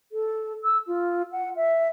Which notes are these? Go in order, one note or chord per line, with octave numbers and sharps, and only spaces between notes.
A4
E6
F4
F#5
E5